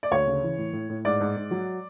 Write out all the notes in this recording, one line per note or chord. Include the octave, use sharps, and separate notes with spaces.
D5
D2 C#5
C#3
E3
A2
A2
A2
G#2 D5
G#2
G#2
F#3